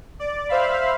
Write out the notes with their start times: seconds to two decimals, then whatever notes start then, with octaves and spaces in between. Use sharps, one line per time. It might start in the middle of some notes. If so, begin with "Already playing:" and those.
0.20 D5
0.49 C5 E5 F5 B5